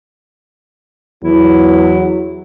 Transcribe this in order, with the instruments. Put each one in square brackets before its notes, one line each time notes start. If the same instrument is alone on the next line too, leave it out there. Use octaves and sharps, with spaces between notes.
[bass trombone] E2 [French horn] F#3 [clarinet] E4